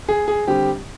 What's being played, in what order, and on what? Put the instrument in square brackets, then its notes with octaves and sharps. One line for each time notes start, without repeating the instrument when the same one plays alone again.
[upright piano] G#4
G#4
D3 G3 C4 G4